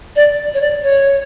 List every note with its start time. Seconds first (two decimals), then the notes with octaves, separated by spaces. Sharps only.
0.16 D5
0.54 C#5
0.61 D5
0.82 C#5